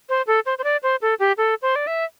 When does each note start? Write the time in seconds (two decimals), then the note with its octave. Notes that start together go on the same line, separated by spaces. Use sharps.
0.09 C5
0.27 A4
0.46 C5
0.58 C5
0.64 D5
0.83 C5
1.02 A4
1.20 G4
1.37 A4
1.62 C5
1.76 D5
1.87 E5